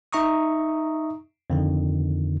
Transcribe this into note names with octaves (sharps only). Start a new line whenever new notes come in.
D#4 E5 A#5 C#6 D#6
F2 D3 D#3